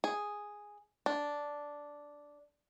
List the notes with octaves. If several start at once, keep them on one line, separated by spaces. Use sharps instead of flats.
G#4
D4